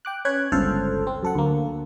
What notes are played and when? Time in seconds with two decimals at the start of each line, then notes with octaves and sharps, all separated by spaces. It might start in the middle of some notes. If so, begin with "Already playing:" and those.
0.05 G5 D6 F#6
0.25 C#4 B4 C#5 F#6 G#6
0.52 G1 C#2 A4 C5 F6
1.07 C4
1.23 F#2 A4 F#5
1.35 D2 A#3